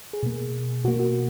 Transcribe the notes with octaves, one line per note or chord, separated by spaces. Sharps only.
G#4
B2 A#3
B2 A#3 F#4
F#4